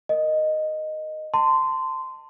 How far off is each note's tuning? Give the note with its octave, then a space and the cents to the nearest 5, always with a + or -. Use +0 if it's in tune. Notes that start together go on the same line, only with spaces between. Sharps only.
A#4 +0 D#5 -5
A5 +30 C6 -15